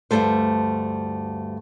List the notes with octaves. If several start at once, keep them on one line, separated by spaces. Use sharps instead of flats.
D2 G2 A#2 G3 A3 C5